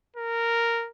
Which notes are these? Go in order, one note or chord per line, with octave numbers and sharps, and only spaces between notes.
A#4